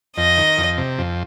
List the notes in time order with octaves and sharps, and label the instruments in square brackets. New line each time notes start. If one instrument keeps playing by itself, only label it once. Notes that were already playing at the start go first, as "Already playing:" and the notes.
[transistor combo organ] F2 [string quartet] D#5
[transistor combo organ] D#3
F2
C3
F2